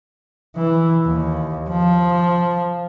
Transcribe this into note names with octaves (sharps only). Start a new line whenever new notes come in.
E3
D#2
F3